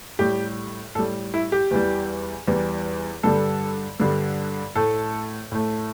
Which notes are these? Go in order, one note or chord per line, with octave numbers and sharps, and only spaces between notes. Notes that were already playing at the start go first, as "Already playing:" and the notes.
A2 G3 G4
A2 G3 A4
E4
G4
E2 E3 G3
E2 E3 G3
G2 D3 G3 A4
G2 D3 G3
A2 A3 A4
A2 A3